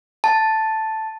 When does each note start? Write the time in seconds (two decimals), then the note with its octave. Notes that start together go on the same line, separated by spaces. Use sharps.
0.24 A5